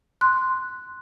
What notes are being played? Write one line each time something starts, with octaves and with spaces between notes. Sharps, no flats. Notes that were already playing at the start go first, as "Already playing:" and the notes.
C6 F#6